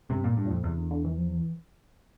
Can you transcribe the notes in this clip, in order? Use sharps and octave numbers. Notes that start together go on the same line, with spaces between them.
G2 C3
A#2
A2
G2
F2 A#2
E2 C3
D3
D3
E3
F3
E3